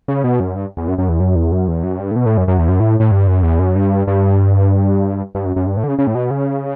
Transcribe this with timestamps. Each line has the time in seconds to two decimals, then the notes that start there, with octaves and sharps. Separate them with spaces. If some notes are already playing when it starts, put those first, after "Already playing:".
0.08 C#3
0.24 B2
0.40 F#2
0.56 G2
0.77 E2
0.88 F#2
0.98 F#2
1.09 E2
1.20 F#2
1.36 E2
1.52 F#2
1.68 E2
1.84 F#2
2.00 G2
2.11 A2
2.16 B2
2.26 A2
2.37 F#2
2.48 F#2
2.58 E2
2.69 F#2
2.80 A2
3.00 A2
3.11 G2
3.27 F#2
3.43 E2
3.59 F#2
3.76 G2
4.07 G2
5.35 G2
5.45 F#2
5.56 F#2
5.67 G2
5.77 A2
5.84 D3
5.88 C#3
5.99 C#3
6.07 A2
6.15 B2
6.31 C#3